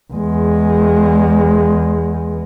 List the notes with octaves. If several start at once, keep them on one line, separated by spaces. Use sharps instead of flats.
E2 G#3